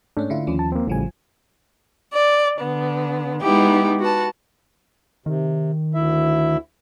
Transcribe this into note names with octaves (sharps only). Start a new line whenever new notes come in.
G#2 A3 C#4 D4
D3 E4 F4
D#2 F3 C#4
A5
A#3 C4
A1 A2 C#3 F3 G3 G#5
D5
D3 B3
G#3 B3 D#4 E4 G4
F#4 B4 A5
C3 D#3
D2 E4 E5